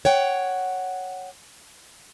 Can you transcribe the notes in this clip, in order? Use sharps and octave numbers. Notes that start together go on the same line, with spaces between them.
C#5 F#5 G5